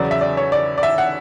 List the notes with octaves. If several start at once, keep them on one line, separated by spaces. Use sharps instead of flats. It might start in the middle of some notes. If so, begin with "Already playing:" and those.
Already playing: E2 C#3 F#3 D5
E5
D5
C#5
D5
D5
E5
F#5